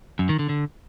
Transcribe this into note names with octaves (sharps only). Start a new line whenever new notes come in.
F#2
D#3
D3
D3